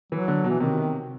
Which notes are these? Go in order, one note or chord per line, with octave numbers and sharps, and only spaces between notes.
E3 F#3
D3
B2
E3
C3 D#3